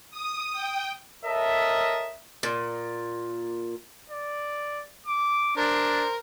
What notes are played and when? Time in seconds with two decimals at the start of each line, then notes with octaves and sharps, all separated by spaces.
0.11 D#6
0.53 G5
1.25 A4 A#4 C#5 D#5 E5
2.43 A#2
4.10 D5
5.07 D6
5.57 D4 A#4 C5